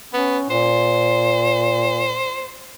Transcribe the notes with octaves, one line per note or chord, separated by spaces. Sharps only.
B3 C#4
A#2 C5